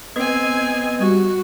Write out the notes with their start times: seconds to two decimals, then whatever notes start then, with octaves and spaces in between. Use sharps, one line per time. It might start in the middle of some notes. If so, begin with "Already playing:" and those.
0.16 B3 C4 D#5 G#5 G#6
1.00 G3 F#4